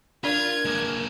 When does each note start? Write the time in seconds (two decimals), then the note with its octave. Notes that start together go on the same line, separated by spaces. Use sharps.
0.24 D4 F4 A#4 D5 F5 G#6
0.65 G#3 A#3